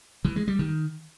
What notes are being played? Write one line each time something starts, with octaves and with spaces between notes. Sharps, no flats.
E3
G#3
G3
D#3